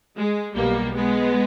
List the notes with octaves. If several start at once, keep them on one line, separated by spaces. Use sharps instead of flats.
G#3
B1 B2 G3 A#3
G#3 B3